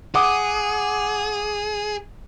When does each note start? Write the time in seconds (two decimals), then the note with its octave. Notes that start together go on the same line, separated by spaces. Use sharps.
0.15 G#4 F#5 D6 D#6